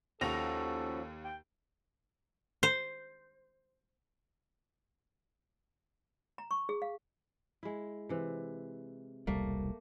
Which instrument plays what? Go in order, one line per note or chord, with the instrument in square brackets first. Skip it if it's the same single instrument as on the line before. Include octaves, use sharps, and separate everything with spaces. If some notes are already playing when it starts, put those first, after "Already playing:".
[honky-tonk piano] D#2 A#6 F7 [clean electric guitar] F3 C#4 F#4 [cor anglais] A4
[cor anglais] G5
[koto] C5
[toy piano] A#5
C#6
G#4
F5
[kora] G#3 E4
C3 E3
[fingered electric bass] E1 C2 G3 [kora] A3 A#3